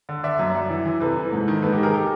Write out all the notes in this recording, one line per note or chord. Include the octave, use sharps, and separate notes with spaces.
D3
D3 D5 E5
F#2
F#2
E3
E3
C3 A4 B4
E3
G#2
D#3
G#2 A4 B4
G4 A4
D#3
G#4 A#4
G4 A4